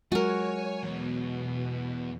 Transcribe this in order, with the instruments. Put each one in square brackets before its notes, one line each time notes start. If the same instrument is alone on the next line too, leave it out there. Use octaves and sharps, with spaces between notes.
[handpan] F#3 G#3 [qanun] F#4 A#4 [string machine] C#5 [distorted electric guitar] G#5
[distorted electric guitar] E2 B3 [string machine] B2